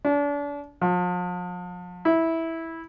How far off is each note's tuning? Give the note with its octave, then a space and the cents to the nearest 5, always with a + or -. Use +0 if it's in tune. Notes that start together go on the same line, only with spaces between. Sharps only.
D4 -35
F3 +40
E4 -10